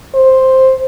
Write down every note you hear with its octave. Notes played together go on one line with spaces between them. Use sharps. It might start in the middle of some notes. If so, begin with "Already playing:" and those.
C5